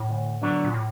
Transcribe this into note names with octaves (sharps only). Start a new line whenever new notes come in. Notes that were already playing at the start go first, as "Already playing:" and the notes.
Already playing: A2
D2
D3 F#3 B3 D4
A#2
A2